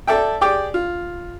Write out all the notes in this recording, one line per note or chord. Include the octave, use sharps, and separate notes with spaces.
A4 D5 E5 G5
G4 G#4 D5 G5 D6
F4